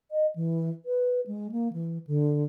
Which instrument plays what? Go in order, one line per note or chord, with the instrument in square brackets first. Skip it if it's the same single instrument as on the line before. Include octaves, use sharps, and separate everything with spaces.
[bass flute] D#5
E3
B4
G#3
A#3
E3
D3